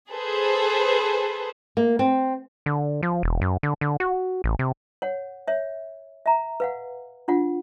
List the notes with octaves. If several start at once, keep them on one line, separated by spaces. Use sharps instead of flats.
G#4 A4 B4 C5
A#3
C4
D3
F3
E1
F#2
D3
D3
F#4
A1
C3
C#5 F#5
C#5 E5
E5 A#5
B4 F5 F#5
D4 F4 F#5